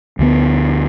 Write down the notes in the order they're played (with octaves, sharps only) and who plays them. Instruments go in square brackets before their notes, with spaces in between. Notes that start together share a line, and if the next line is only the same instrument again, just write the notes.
[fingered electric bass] D2 D3 F3 B3